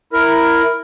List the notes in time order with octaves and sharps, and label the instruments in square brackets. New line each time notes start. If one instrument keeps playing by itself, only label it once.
[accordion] E4 A#4